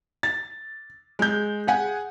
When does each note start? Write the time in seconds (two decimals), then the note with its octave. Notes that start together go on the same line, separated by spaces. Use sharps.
0.23 A6
1.19 G#3 G6
1.67 G#4 F#5 G#5